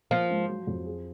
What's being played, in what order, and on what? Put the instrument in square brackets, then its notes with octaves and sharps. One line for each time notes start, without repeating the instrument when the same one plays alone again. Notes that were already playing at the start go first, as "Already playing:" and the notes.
[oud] F3 [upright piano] A#3
[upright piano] G#2
F#3
F2
G#4